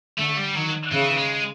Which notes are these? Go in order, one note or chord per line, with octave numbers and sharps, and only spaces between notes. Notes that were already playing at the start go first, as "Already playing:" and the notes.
D3 A3
G3
D#3 F#3
C#3 E3
G#3